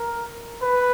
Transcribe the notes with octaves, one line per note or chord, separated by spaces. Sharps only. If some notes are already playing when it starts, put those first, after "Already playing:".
Already playing: A#4
B4